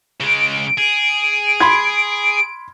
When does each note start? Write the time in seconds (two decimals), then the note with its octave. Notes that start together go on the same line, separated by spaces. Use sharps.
0.21 C#3 G#3 D7
0.78 G#4
1.60 B5 C6 G#6